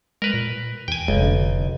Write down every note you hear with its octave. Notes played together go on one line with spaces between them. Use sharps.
G#3 A#4 B4
A#2
E2 G5 G#5
F1 B1 G#3
D3